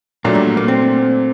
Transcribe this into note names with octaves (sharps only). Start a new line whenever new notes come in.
A#2 F#3 A3 A#3 D4
G3
A#3
C4